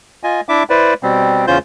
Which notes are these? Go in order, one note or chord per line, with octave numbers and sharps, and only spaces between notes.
F4 D#5 G#5
D4 E4 E5 D6
E4 B4 C5 D5
B2 G3 C4
E2 C#3 C#4 F4 C5 G6